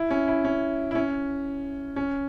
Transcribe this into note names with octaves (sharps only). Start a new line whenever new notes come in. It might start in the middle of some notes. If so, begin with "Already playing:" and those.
Already playing: E4
C#4
E4
C#4
E4
C#4
C#4